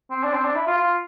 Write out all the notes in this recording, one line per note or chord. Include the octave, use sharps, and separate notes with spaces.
C4
D4
C4
D4
E4
F4
F4